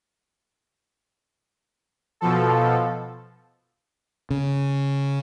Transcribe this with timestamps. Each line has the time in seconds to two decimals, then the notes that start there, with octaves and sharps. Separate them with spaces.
2.21 B2 F3 A4
4.30 C#3